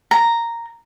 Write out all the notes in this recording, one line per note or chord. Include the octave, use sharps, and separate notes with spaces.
A#5